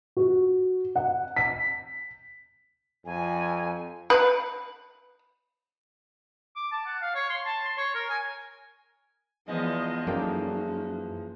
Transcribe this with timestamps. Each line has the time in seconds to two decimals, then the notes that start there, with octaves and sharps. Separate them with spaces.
0.17 F#4
0.96 F#5
1.36 B6
3.06 F2 G#5
4.10 B4
6.56 D6
6.72 A5
6.86 F#5
7.01 F5
7.15 C#5
7.30 C6
7.46 A5
7.65 C6
7.77 C#5
7.95 A#4
8.09 G#5
9.48 E2 F3 G#3 B3 D#5
10.07 F#2 A#3 C#4 D#4 A4 G5